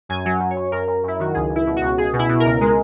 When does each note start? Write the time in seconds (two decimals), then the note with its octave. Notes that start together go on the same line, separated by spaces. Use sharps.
0.09 F#2 G#5
0.25 F#3
0.40 F#2
0.50 C#5
0.56 F#2
0.72 F#2 A#4
0.88 F#2
1.03 F#2 E4
1.19 D#3 F#4
1.34 C#2 G#4
1.50 C#2
1.55 E4
1.67 B2
1.76 F#4
1.81 C#2
1.98 C#2 G#4
2.13 B2
2.19 E4
2.29 B2
2.40 A#4
2.45 C#2
2.61 G#3